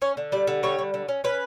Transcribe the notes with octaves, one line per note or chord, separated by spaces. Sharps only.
C#4 C#5
D3
G3 D5
D3
G3 C#5
D3
D3
C#4
C#4 B4